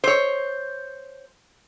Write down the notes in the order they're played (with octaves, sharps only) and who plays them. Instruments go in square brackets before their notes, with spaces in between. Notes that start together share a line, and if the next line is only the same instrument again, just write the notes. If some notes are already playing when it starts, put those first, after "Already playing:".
[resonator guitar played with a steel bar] C5 C#5